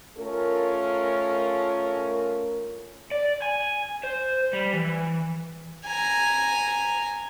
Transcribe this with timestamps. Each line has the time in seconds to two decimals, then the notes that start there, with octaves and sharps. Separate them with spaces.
0.17 A3 C#4 F4 A#4
3.11 D5
3.42 G#5
4.03 C5
4.53 G3
4.73 E3
5.85 G#5 A#5